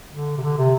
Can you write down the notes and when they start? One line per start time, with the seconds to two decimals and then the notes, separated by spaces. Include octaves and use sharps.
0.13 D3
0.37 C3
0.42 D3
0.58 C3